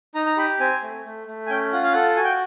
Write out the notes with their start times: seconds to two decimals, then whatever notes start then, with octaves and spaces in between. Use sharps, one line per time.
0.15 D#4 A#5
0.26 A#5
0.37 G4 B5
0.60 C4 G#5
0.83 A3
1.05 A3
1.27 A3
1.46 G#5
1.50 C#4 G5
1.73 F4 F#5
1.83 F5
1.92 A4 F#5
2.16 F#4 G#5
2.24 G5